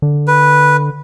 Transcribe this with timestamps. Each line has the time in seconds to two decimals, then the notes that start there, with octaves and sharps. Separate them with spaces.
0.02 D3
0.28 B4